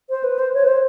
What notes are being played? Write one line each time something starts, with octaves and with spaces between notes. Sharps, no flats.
C5
B4
C5
C#5
B4
C5